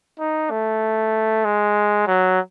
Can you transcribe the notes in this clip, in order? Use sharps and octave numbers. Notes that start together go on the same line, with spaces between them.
D#4
A3
G#3
F#3